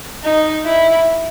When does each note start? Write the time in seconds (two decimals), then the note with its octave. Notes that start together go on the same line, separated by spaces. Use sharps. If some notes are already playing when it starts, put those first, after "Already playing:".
0.24 D#4
0.66 E4